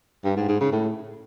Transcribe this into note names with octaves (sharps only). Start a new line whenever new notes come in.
G2
G#2
G#2
C#3
A2